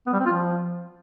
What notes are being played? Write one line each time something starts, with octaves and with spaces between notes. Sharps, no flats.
B3
G3
C4
F4
F3